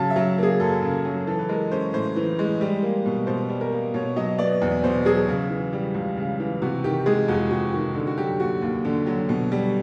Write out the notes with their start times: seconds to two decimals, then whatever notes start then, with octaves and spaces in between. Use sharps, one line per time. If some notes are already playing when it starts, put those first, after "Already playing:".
Already playing: C#3 F#3 A5
0.10 E5
0.16 F#3
0.38 A#3 G#4
0.60 F#2 A4
0.82 C#3
1.05 F#3
1.27 E3 A4
1.39 B4
1.49 G#3 A#4
1.71 C#4 C5
1.93 A2 C5
2.16 E3
2.39 G#3
2.61 G3
2.83 A#3
3.06 B2
3.27 B2 C5
3.50 G3
3.61 A#4
3.72 A#3
3.94 B2 C#5
4.16 F#3 D#5
4.38 B3 D5
4.61 E2
4.83 B2 C5
5.05 F#3 G#4
5.29 C#3
5.50 E3
5.73 G3
5.94 C#2
6.17 C#3
6.40 E3
6.62 C3 F#4
6.84 D#3 G4
7.06 G#3 G#4
7.28 F2 F#4
7.51 C3 F#4
7.73 D#3 F#4
7.95 D3
8.07 F#4
8.18 F#3 G4
8.40 D#2 F#4
8.62 D#2
8.85 D3
9.07 F#3
9.29 B2
9.52 G3